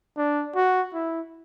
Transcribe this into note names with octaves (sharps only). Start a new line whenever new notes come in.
D4
F#4
E4